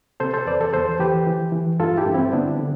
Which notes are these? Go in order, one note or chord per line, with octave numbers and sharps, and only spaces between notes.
C3 A4 C5
A4 C5
E2 B4 D5
A4 C5
E2 A4 C5
E3 G4 B4
E3
E3
G2 F4 A4
E4 G4
G2
C4 E4
D3 B3 D4
D3